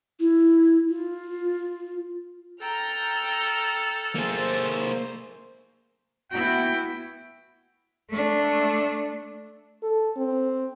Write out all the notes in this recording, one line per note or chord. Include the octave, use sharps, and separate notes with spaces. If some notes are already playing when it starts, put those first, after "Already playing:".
E4
F4
A4 G5 A#5 F6
A#3 G#4 C5
B3 E4 F#4 G5
A3 D4
A4
C4